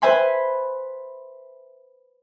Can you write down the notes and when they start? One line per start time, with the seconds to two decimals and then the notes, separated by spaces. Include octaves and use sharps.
0.02 B4 C5 E5 G#5 B5 C6